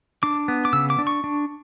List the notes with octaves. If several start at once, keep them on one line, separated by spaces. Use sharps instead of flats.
D4 D6
B3
D6
C#3 E6
D6
D4
C#6
D4